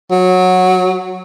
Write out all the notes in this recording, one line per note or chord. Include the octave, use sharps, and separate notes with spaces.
F#3